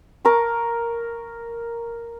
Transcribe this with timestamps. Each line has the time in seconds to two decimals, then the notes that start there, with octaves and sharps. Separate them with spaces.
0.25 A#4 C#6 D6